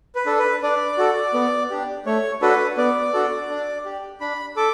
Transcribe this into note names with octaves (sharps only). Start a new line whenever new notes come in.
B4
D4 A4
B4
D4 D5
F#4 A4
B3
D4 G4
A3 C#5
D4 F#4 A4 B4
B3 D5
D4 F#4 A4
D4
G4
D4 B5
A4 D6